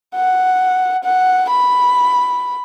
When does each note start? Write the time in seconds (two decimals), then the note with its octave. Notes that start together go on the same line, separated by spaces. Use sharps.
0.15 F#5
1.04 F#5
1.50 B5